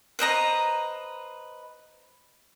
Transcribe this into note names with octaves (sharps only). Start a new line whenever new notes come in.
B4 C5 D#5 A#5